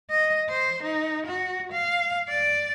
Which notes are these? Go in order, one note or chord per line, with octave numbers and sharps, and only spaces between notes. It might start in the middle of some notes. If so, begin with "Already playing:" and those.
D#5
C5
D#4
F#4
F5
D5